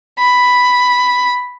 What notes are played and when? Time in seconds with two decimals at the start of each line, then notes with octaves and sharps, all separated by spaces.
0.19 B5